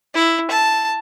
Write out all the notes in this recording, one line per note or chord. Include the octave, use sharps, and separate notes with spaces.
E4
A5